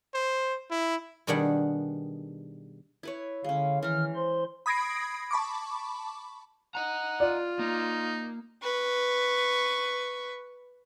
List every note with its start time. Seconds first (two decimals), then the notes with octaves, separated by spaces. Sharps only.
0.14 C5
0.71 E4
1.27 B2 D#3 G3 D4 G#4 F#5
3.03 E4 B4 C#5
3.44 D3 G#3 C#4 F5
3.83 D#3 E3 A#5 F6
4.16 C5 C6
4.66 B5 D#6 G#6 A#6 C7 D7
5.31 A5 B5 C#6 D6
6.75 D#5 F#5 A#5
7.20 F4 D5
7.59 A#3 D#4
8.63 B4 C#6